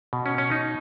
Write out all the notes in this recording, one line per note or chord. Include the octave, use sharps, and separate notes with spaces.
B2
C#4
C#4
D#4